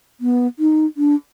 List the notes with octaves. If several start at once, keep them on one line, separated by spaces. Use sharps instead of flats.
B3
D#4
D4